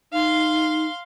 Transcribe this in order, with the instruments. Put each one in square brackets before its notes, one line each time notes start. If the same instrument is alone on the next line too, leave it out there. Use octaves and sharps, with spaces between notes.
[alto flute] D#4 [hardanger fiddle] F5 C6